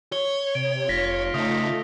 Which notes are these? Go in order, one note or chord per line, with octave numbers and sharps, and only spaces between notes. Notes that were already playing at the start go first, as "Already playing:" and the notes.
C#5 G7
C3 D7
F1 F4 A#6 B6
C#3 A3 D#4 D#6